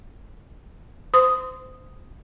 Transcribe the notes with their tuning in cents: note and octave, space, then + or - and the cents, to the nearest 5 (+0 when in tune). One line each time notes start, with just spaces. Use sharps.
C5 -25 C6 -25 D#6 +0